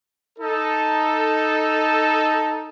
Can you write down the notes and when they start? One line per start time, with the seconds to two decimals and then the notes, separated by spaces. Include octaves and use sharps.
0.39 D#4 A4